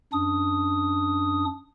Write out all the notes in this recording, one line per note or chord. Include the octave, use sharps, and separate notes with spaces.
F#2 D4 D#6